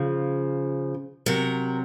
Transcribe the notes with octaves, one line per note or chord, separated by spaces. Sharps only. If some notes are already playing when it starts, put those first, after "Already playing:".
Already playing: C#3 F3
C3 F#3 A#4